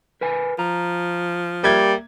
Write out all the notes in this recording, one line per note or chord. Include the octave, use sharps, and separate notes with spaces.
A#4 B4 G#5
F3 A#5
G3 A#3 E5 G#6